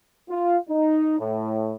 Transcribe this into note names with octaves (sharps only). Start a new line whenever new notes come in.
F4
D#4
A2